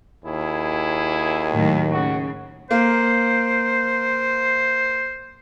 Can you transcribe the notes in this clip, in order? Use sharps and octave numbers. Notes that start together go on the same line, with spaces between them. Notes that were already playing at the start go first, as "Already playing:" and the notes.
D#2 E4 G#4
A2 D#3 F#3
C#3 F#4
A#3 C5